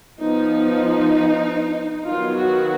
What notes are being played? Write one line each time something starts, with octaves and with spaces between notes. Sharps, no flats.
F3 B3 D#4
D#3 F#3 B3 F4
F#4